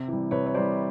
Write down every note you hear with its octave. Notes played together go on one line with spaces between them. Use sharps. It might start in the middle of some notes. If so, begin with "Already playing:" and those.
Already playing: C3
E3 G3
C3 B4 C#5
C#5
E3 G3 C5 D5